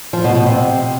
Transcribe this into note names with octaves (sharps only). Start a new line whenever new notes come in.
F3
B2
B2
C3